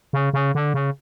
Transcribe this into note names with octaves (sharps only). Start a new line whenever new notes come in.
C#3
C#3
D3
C#3